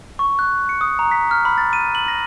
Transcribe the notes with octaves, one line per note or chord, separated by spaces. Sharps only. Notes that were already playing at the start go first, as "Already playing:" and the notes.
C#6
F#6
C#7
D#6
A#5
B6
F6
B5
A6
D#7
F#7
A#6